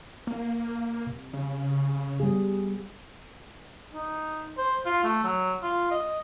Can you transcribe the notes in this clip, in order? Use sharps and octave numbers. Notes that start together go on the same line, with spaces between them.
A#3
C3
C#3
G3 B3 G#4
D#4
C5
F4
A3
F#3
F4
D#5